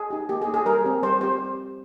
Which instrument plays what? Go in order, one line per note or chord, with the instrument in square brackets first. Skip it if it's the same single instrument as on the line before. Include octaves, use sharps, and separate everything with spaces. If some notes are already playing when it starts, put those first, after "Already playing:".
Already playing: [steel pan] G#4
D#4 G4
A#3 G4
G#4
D#4 G4
G#4
G3 A#4
C4 G4
G3 C5
C4 G4 C5